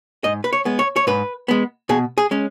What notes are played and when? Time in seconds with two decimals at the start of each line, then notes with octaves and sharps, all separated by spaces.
0.24 G#2 D#5
0.44 B4
0.53 C#5
0.65 G#3 B3
0.79 C#5
0.96 C#5
1.07 G#2 B4
1.48 G#3 B3
1.89 B2 G#4
2.18 G#4
2.31 G#3 C#4